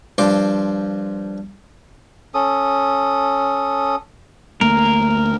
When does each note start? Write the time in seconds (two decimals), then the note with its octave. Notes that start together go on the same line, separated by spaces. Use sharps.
0.18 G2 F3 C6 D6
2.34 C#4 A4 D#6
4.61 D2 A3 A#3 A#4